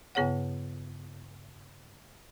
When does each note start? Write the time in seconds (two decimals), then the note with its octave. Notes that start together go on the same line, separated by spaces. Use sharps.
0.15 G2 C#3 B3 G#4 C#5 F#5